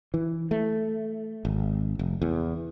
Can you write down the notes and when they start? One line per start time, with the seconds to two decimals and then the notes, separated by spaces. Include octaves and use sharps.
0.14 E3
0.51 A3
1.45 G#1
1.99 F1
2.22 E2